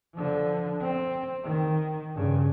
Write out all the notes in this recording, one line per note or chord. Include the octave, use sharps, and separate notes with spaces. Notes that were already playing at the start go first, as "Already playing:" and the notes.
D3 F3
C4
D#3
G2 C#3